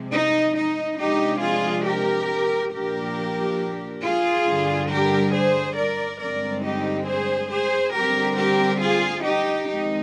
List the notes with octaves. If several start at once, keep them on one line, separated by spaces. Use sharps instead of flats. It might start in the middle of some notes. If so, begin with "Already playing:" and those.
Already playing: C3 F3 G#3
D#4
D#4
C3 F3 G#3 D4 D#4 G4
F4 G#4
G4 A#4
A#2 F3 A#3 D4 G4 A#4
F4 G#4
G2 D3 G3
G4 A#4
G#4 C5
A#4 D5
G2 D3 G#3 C4 A#4 D5
D#4 G4
G#4 C5
G#4 C5
D3 G3 C4 G4 A#4
G4 A#4
F4 G#4
D#4 G4
F2 D#3 G#3 C4 D#4